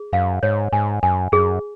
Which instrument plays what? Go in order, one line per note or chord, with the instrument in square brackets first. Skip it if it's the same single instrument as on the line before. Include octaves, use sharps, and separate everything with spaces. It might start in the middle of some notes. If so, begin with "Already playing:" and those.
Already playing: [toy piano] G#4
[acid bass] F#2 [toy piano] F5
[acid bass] G#2 [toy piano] C#5
[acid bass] G#2 [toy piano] G#5
[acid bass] F#2 [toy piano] G#5
[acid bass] F#2 [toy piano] G#4